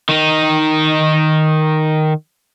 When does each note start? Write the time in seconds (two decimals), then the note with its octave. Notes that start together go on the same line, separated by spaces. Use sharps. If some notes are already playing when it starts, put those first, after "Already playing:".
0.09 D#3 D#4